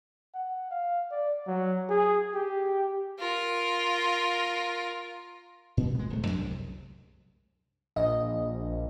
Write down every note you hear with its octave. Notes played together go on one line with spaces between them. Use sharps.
F#5
F5
D5
F#3
G#4
G4
F4 A#4
A#2
G#3 B3
D1 A3
F2 F#3 G#3 D4
C2
A#1 D#5